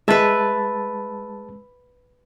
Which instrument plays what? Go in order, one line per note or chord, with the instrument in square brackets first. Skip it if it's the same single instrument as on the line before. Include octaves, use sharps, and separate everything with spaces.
[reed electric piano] G#3 A5 A6 [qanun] B4 E5